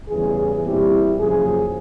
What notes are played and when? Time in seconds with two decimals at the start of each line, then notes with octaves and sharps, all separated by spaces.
0.09 E2 C#3 E3 G3 G#4
0.64 A#2 G3 C4 E4 G4
1.18 F#2 C#3 F3 A#3 G#4